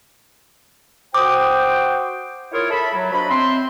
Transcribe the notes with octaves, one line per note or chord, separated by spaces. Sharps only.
F#4 C5 G5 D6 D#6
E4 F4 G#4 A#4 C#5
A4 E5 B5
F#3
F3 D4 F#4 D#5 B5
F#3 C4 E5 C6